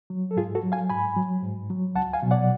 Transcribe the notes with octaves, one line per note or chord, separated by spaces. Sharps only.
F#3
A4
G#2 F4 G#4
F#4 A4
F#3
F5 G#5
G#2 G#5 B5
F#3
G#2
F#3
C#2 F#5 A5
F5 G#5
B2 F#3
D5 F#5